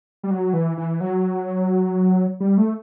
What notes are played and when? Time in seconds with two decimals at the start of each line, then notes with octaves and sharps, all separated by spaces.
0.23 G3
0.31 F#3
0.53 E3
0.77 E3
1.00 F#3
2.40 G3
2.58 A3